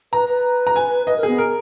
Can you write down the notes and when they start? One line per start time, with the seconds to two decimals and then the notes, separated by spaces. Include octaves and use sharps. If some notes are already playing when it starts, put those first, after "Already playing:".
0.13 B4 A#5
0.29 B4
0.67 A#5
0.76 G#5
1.07 B4 D#5
1.17 A#4
1.23 B3 G#4
1.38 A#4